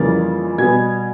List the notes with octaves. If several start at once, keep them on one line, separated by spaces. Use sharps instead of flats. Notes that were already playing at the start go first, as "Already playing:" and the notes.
Already playing: F2 C#3 E3 G3 A#3 A6
B2 G3 B3 G#5 G#6